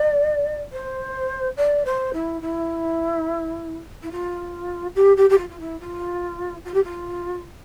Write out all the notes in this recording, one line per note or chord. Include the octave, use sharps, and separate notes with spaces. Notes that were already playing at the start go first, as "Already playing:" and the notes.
Already playing: D5
C5
D5
C5
E4
E4
E4
F4
G4
G4
G4
F4
F4
E4
F4
F4
G4
F4